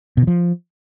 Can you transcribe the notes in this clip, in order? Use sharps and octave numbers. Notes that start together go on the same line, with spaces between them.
B2
D#3
F3